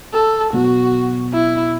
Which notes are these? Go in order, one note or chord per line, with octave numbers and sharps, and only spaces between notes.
A4
B2 F#3 B3 F#4
E4